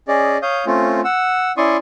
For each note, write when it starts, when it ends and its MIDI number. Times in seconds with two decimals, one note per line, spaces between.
0.08 0.37 61
0.08 0.37 68
0.08 0.37 74
0.08 0.37 75
0.42 0.65 73
0.42 0.65 77
0.42 0.65 87
0.42 0.65 91
0.66 1.00 57
0.66 1.00 60
0.66 1.00 61
0.66 1.00 65
1.04 1.52 78
1.04 1.52 88
1.57 1.77 61
1.57 1.77 64
1.57 1.77 74
1.57 1.77 84
1.57 1.77 85
1.57 1.77 87